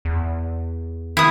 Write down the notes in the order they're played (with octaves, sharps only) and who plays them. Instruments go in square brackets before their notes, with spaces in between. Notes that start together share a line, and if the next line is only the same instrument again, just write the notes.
[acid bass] E2
[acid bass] D#3 [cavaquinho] E4 D#6